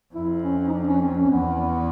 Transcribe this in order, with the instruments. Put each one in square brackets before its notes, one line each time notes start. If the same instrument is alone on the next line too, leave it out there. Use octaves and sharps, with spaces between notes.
[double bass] F2 [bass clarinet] E4
[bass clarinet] C#4
C#4
D#4
D4
C#4
C4
C#4
[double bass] E2 [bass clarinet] B3